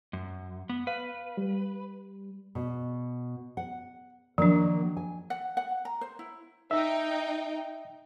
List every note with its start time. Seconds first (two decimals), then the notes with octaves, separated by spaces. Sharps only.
0.13 F#2
0.69 B3
0.87 B4 F5
1.37 G3
2.55 B2
3.57 F#5
4.38 D#3 F3 F#3 A#3 D4
4.97 G#5
5.30 F#5
5.57 F#5
5.85 A#5
6.01 C5
6.19 E4
6.71 D#4 E5 G5